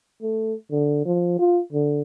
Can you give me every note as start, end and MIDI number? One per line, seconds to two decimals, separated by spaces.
0.22 0.54 57
0.71 1.03 50
1.05 1.36 53
1.39 1.60 65
1.73 2.02 50